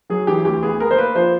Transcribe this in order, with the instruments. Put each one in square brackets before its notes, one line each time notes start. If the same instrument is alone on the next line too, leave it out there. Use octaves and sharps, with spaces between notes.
[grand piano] F#3 G#4
E3 G4
D2 G4
B3 G#4
B3 A#4
C5
A#3 B4
F3 C5